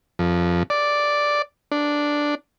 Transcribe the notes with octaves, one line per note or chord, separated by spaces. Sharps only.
F2
D5
D4